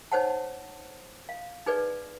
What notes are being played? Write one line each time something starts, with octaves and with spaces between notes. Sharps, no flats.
D#4 C5 C#5 F#5 A5
F5
D#4 G#4 B4 D5